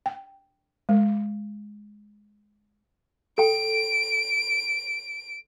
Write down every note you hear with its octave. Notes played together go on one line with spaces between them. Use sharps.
G5
G#3
A4 G5 D7